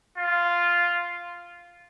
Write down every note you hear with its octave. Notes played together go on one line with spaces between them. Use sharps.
F4